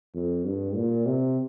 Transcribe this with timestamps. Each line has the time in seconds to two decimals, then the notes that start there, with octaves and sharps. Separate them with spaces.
0.15 F2
0.45 G2
0.76 A#2
1.06 C3